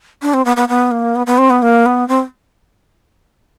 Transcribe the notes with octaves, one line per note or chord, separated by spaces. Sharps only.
D4
C4
B3
B3
B3
A#3
B3
B3
C4
B3
A#3
B3
C4